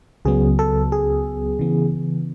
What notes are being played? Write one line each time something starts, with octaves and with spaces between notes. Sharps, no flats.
C#2 C#3 F#3 B3 G#4
A4
G#4
C#3 E3 B3